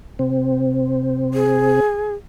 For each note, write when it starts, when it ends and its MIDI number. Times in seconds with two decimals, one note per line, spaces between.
0.19 1.80 48
0.19 1.80 60
1.34 2.13 68